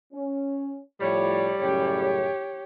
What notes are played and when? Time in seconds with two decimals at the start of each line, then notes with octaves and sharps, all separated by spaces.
0.13 C#4
1.01 A2 F3 G3 C#5
1.59 F#2 A2 C#3 G4 C#5